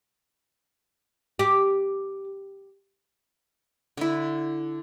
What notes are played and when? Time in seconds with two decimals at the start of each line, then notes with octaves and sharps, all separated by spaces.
1.39 G4
3.97 D3 E4